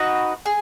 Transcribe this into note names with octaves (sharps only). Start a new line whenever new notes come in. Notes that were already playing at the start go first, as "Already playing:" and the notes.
Already playing: D#4 F#4 B4
G#4